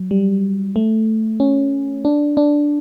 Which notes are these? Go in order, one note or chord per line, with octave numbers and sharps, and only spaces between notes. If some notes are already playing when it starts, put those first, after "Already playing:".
Already playing: F#3
G3
A3
C#4
D4
D4